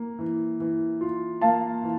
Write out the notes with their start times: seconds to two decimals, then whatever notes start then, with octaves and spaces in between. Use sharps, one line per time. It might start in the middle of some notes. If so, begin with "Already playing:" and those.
Already playing: A#3
0.19 E3
0.60 E3
1.01 F4
1.41 A#3 F5 A5
1.83 E3